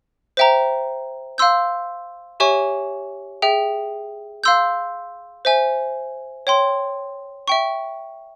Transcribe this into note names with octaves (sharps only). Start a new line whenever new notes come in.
C5 E5 G5 A#5
F5 C6 E6 G6
G4 C#5 E5 G#5 C#6
G#4 E5 G5
F5 C6 E6 G6
C5 E5 G#5
C#5 G5 C6
E5 G5 C#6